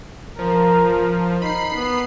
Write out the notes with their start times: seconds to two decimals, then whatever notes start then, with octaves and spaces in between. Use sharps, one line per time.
0.39 F3 A#4
1.42 D#4 B5 C7
1.75 B3